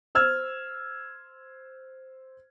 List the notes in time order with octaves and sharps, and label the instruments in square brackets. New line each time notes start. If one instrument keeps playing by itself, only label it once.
[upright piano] C5 E6 F6 G#6